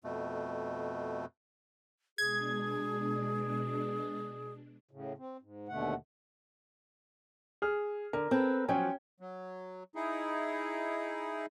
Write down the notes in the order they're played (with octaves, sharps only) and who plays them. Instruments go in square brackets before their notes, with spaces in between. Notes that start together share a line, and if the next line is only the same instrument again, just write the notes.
[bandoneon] F2 B2 A3
[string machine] B2 G#3 D4 [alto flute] G#4 [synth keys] G#6
[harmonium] A2 C#3
C4
G#2
D#2 B2 D3 A3 F#5
[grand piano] G#4 F6
[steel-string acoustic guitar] D3 [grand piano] A#4
[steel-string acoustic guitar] C4 A4 B4
[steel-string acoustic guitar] F3 F#3 [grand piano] C#4 G5 G#5
[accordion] F#3
D#4 E4 G#4